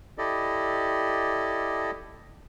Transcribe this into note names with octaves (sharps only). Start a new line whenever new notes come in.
E4 G4 A4 D5 D#5